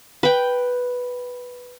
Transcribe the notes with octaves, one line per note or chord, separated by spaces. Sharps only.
B4 G5